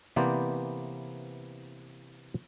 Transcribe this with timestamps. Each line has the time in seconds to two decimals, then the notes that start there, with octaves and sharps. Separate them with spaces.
0.16 C3 E3 A#3 B3 C5 D5